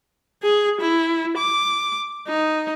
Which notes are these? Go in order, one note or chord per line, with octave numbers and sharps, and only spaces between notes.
G#4
E4
D6
D#4